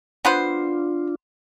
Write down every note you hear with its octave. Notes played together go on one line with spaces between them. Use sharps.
B3 D4 F4 B4 C5